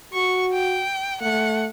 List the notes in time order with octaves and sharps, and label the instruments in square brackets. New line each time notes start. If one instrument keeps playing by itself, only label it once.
[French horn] F#4 [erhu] C#6
[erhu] G5
[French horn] A3 [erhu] F#5